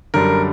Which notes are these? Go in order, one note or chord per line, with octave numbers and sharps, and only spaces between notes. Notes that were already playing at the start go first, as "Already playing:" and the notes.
F#2 D3 G3 A#4